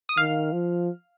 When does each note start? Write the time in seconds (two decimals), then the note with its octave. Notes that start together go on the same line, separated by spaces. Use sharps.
0.09 D#6
0.17 D#3 F5 F6
0.52 F3